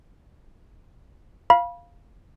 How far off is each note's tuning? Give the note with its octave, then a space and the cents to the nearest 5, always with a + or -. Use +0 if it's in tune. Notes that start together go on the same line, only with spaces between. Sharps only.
F5 +0 B5 -30